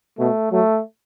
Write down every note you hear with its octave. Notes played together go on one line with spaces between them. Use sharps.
B2 A3
F#3 A3